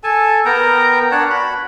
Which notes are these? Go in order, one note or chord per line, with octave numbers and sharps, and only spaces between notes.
A4 G#5 A5
B3 A#4 G5 A#5
D4 C#5 F#5 A5
F#4 B5